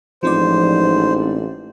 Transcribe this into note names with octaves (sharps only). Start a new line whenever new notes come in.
A1 G#2 F3 C4 C5 D5